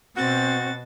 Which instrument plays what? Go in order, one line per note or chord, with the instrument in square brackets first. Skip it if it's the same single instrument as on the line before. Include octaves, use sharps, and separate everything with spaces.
[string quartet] B2 A6 [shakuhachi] C4 [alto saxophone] F#4